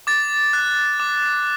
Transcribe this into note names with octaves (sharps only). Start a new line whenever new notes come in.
D6 A6
F#6
D6